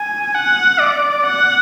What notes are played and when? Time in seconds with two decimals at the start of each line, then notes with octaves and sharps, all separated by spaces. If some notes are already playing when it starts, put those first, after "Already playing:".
Already playing: G#5
0.35 F#5
0.81 D5
1.26 F#5